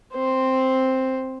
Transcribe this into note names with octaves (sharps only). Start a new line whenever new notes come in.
C4 C5